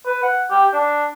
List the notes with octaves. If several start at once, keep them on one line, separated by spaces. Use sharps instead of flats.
B4
F#5
G4
D4